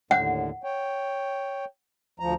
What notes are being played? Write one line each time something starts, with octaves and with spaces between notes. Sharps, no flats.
D#2 A2 D3 F#5
C#5 G5
D2 F3 A#5